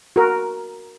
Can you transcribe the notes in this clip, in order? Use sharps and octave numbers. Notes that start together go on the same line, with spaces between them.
F#4 A#4